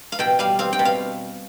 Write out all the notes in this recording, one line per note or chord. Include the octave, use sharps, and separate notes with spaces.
F5
B2 G5
G3 F5
C4 F5
G5
B2
F5